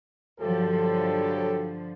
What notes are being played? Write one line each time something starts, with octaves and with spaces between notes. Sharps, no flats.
G2 D3 F3 F#3 G4 A4